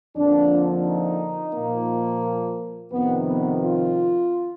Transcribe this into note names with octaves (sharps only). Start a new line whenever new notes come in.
F2 D3 F3 A#3 D4
D#4
A#2 F3 A#3
F2 C3 D#3 B3
B3
F4